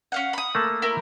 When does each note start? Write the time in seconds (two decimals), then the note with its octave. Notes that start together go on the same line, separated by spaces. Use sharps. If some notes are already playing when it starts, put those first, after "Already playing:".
0.12 C#4 F5 F#5
0.33 B5 D#6
0.55 A3 A#3 A5
0.82 E4 A#4